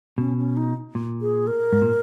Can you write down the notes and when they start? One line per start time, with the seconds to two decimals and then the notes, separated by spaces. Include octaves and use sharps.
0.18 B2 C#4
0.38 C#4
0.57 D#4
0.95 A#2
1.22 G#4
1.47 A#4
1.73 G#2
1.82 A#2